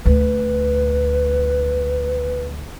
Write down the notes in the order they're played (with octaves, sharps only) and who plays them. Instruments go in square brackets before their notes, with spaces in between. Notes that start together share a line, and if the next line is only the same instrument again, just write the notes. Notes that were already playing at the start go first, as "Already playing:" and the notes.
[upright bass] D2 [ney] B4